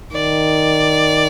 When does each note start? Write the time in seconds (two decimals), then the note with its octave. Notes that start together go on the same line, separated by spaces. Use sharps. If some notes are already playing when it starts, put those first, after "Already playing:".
0.13 D#3 D5